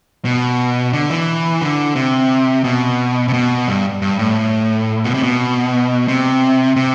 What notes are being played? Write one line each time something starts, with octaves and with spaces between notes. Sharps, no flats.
B2
D3
E3
D3
C3
B2
C3
B2
G2
G2
A2
B2
C3
B2
C3
C3